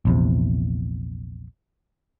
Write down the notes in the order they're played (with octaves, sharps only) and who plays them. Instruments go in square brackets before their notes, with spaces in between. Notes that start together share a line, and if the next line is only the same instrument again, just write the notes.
[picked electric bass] A#1 E2 C3